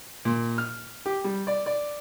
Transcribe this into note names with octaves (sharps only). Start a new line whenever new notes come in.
A#2
F6
G4
G3
D5
D5